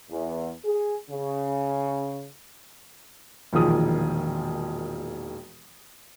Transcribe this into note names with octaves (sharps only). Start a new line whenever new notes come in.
E2
G#4
C#3
E1 A#2 D#3 F3 G#4 D#6